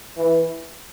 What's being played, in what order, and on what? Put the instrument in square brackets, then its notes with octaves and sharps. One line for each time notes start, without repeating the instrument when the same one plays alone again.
[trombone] E3